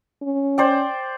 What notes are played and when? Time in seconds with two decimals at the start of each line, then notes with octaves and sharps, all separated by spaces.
0.22 C#4
0.58 C5 D5 G5